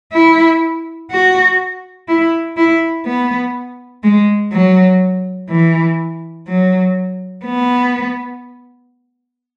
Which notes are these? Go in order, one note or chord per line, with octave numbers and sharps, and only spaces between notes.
E4
F#4
E4
E4
B3
G#3
F#3
E3
F#3
B3